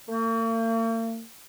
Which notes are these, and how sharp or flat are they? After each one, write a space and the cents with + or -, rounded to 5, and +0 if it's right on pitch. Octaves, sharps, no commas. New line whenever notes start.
A#3 -45